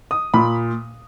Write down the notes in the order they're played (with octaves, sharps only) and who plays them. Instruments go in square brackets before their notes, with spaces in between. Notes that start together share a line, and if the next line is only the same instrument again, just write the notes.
[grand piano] D#6
A#2 B5